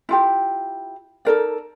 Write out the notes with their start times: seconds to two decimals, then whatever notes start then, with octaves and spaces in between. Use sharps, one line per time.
0.09 E4 F4 G4
1.25 D#4 A4 A#4 D5